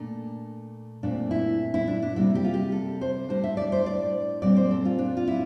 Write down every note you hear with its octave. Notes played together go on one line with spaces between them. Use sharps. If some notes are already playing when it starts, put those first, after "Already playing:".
Already playing: A#2 A3 D4
A#2 A3 C4 D4
E4
E4
D4
D4
C3 G3 A#3 E4
G4
F4
G4
A4
C5
A2 G3 D4 C5
E5
D5
C5
D5
A#2 G3 C4 D5
C5
A4
F4
D4
F4
E4